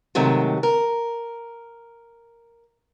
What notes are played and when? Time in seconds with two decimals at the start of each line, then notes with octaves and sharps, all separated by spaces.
0.15 G#2 C3 D#3 F#3 A3
0.63 A#4